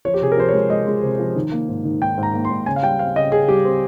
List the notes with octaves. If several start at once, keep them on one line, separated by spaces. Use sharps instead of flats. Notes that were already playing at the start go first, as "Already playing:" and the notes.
F3 C#5
G4
C3 G#4
A#4
F3 C5
C#5
G#3
G#3 D#5
G#3
C3
F3
D#3
A#3
G#2
D#3
G#2 G5
G#2
A#5
A#3
C6
G#2
C#3 G#5
F5
G3 G5
C4 F5
C#3 D#5
C#3 G#4
G3 G4
C4